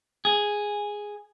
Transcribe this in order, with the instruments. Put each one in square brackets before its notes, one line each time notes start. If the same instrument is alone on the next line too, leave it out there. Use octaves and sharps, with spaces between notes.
[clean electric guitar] G#4